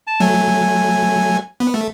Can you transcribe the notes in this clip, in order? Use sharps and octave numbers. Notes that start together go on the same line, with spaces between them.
A5
F#3 A3 G#5
B3
A3